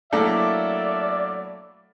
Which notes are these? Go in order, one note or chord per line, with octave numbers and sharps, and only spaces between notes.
F#3 A3 A#3 D4 E4 A4 D5 E5